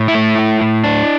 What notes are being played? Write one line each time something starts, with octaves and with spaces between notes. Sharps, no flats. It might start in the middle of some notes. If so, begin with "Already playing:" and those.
Already playing: A2
E4
A3
A2
A2
D4